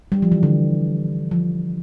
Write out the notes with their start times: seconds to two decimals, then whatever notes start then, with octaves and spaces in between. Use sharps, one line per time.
0.12 G3
0.22 F3
0.32 E3
0.43 D3
1.31 F3